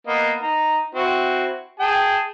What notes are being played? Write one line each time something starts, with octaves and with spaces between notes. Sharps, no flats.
A#3 B3 D#5
D#4 A#5
C4 E4 F#4
G#4 G5 A5